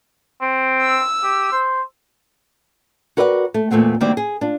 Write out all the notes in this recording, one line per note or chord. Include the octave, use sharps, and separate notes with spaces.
C4
E6
G4
C5
F#4 A#4 B4 D5 D#5 F#5
A3
E2 A#2 A3 C4 F#5
D2 D#3 G3 A#3 C4 D5
G#4
D4 F4